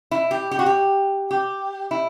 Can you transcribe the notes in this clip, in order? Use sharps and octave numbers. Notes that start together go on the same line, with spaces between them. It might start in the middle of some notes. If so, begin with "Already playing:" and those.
E4
G4
G4
F#4
G4
G4
E4